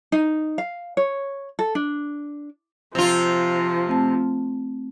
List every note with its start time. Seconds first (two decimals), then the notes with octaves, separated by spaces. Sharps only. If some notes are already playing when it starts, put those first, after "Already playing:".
0.12 D#4
0.58 F5
0.97 C#5
1.59 A4
1.75 D4
2.95 C3 F3 F4
3.87 A3 C4 A5